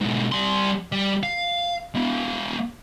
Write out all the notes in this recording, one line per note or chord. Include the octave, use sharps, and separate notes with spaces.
G#2 B2
G3 C6
G3
F5
G#3 B3